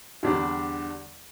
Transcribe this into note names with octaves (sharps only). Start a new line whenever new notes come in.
E2 D3 G3 D4